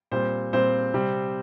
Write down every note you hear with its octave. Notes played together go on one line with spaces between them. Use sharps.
A#2 G3 C4 C5
A#2 G3 C4 C5
C3 G3 C4